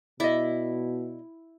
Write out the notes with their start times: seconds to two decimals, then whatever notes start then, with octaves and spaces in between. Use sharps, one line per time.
0.20 B2 E4 D5 D#5